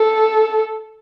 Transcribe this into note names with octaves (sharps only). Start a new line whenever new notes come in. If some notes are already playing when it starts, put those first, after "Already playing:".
Already playing: A4